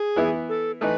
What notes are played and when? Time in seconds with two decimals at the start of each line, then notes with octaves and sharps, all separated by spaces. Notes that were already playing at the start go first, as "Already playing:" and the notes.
Already playing: G#4
0.16 E3 B3 E4
0.49 A4
0.81 E3 A3 D#4 B4